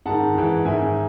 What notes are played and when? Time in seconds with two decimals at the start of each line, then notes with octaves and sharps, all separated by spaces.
0.05 G#2 D#3 F#5 A5
0.35 G#2 E3
0.65 G#2 D#3 E5 G#5